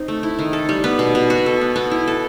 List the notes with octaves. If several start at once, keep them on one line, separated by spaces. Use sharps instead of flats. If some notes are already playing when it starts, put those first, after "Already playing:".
Already playing: C4 D#4
A3
E4
D#3
A4
G3
B3
B2
B2
F#4
A4
B3
B3
E4
A4